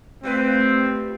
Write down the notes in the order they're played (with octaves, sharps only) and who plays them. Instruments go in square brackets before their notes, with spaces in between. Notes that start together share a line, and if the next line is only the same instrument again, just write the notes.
[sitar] G3 F4 B4 [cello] A3 [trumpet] C4